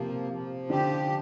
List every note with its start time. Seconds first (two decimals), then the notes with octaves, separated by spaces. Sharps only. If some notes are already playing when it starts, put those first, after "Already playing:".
Already playing: C3 F3 A#3
0.32 F3
0.70 D3 G4